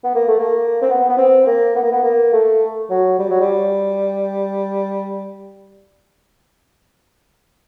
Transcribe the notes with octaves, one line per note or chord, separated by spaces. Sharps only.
B3
A#3
A3
A#3
C4
B3
B3
C4
A#3
B3
A#3
B3
A#3
A3
F#3
G3
F#3
G3